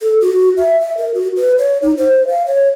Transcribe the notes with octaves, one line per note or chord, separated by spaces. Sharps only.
A4
F#4
E5
E5
A#4
F#4
B4
C#5
D#4
C5
F5
C#5